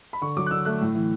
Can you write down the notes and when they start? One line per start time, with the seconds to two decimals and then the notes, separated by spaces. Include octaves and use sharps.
0.13 B5
0.21 D3 C#6
0.36 F#3 D6
0.46 F#6
0.51 D3 E6
0.65 A3 F#6
0.81 A2
0.95 E3